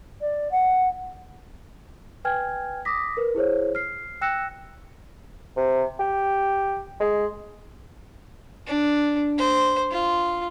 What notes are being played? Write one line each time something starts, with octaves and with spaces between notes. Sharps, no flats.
D5
F#5
B4 G5 G#5 F6 G#6
D6 D#6 A#6 B6
A#4 B4
E4 G#4 C5 C#5
F6 C7
G5 E6 F#6 A#6 C#7 E7
C3
G4
G#3
D4
C5
F4